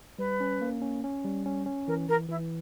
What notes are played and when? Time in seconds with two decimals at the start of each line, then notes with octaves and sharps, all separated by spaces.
0.19 G3 B4
0.40 C#4
0.61 A#3
0.82 C#4
1.04 C#4
1.25 G3
1.46 C#4
1.66 C#4
1.87 E3 A#4
2.09 E3 A#4
2.29 E3 E4